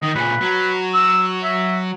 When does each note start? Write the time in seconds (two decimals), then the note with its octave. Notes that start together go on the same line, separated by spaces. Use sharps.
0.02 D#3 D#5
0.15 A#2 C#3 B4
0.41 F#3
0.94 E6
1.43 E5